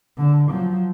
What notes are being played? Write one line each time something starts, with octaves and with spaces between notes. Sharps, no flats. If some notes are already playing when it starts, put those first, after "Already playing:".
D3
F3 F#3